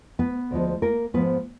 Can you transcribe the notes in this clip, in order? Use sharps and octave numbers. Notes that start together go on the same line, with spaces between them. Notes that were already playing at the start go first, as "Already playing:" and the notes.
B3 B4
D2 D3 F3 G#3
A#3 A#4
G#2 F3 G#3 B3 B4